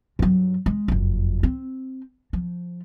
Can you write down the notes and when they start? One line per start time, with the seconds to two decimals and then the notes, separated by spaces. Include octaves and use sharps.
0.19 G2 F#3
0.66 G#3
0.88 F#1 F2
1.43 C4
2.33 F3